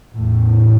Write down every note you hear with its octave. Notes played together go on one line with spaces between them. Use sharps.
E2 A2